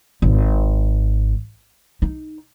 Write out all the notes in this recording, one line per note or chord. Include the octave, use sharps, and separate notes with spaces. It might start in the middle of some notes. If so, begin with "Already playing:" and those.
G#1
D#4